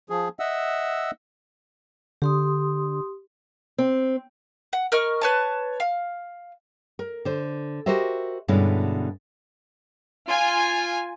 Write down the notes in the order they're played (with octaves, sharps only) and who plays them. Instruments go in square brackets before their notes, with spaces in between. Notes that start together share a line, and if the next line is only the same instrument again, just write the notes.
[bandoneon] F3 G#4
D#5 E5 F#5 E6
[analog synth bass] D3 [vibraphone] G4 C6 D#6
[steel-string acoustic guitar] C4
[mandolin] F#5
A#4 D#5 C#6 F6
B4 C#5 A5
F5
[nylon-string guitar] A#4
D3 C5
F#4 G4 A#4 C5 D#5 E5
G2 B2 D3 G#3 C#4 E4
[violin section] F4 G#5